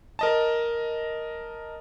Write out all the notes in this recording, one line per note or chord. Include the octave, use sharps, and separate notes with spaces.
A#4 D#5 A5